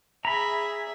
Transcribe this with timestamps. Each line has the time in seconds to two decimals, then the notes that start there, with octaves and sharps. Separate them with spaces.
0.25 G#4 E5 A#5 B5